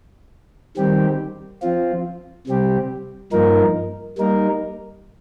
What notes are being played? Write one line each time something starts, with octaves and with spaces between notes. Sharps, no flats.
D#3 G3 C4 G4
F3 C4 F4
C3 G3 C4 G4
G2 F3 A#3 D#4 A#4
G3 A#3 D#4 A#4